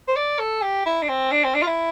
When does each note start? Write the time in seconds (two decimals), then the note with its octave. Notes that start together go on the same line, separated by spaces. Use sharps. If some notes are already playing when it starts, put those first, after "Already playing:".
0.08 C5
0.16 D5
0.39 A4
0.62 G4
0.86 E4
1.03 D4
1.09 C4
1.32 D4
1.44 C4
1.55 D4
1.62 F4
1.67 E4